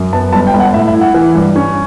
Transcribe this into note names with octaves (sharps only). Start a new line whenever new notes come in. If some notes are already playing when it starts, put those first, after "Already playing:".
Already playing: F#2
B3 A5
G1 A5
G5
G1
F#5
A2 E5
E5
E4
F#5
E3
G2
C#4